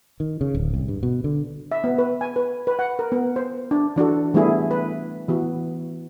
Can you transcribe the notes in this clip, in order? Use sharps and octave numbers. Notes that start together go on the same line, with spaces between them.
D#3
C#3
D1
C2
G2
B2
D3
E5
B3
B4
G#5
B4
B4
F#5
A#4
B3
C5
D4
E3 D4 F#4 A4
E3 G3 A3 B3 E4 G#4
B4
E3 B3 F#4